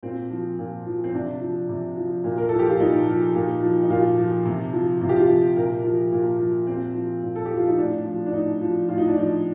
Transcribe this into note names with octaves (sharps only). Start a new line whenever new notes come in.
A#2 C4
F3
A#2
F3
C4
C3 D4
F3
C3
F3
A#2
A#4
F3 A4
G4
F4
A#2 D#4
F3
A#2
F3
D#4
A#2 F4
F3
C3
F3
C3 F4
G4
F4
F3
A#2 A#4
F3
A#2
F3
A#2 C4
F3
A#2
A4
G4
F3
F4
D#4
A2 D4
F3
D4
A2 D#4
F3
A2 F4
D#4
D4
F3 D#4